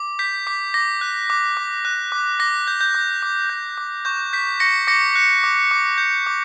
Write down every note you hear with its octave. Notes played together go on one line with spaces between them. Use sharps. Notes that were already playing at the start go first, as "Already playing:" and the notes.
Already playing: D6
G6 B6
D6 B6
D6 A#6
F#6
D6
D6
F#6
D6
D6 A#6
G6
G6
D6
D6
G6
D6
C#6 G6
G6 B6
C#6 A#6 C#7
D6 A#6 C#7
F#6
D6
D6
G6
D6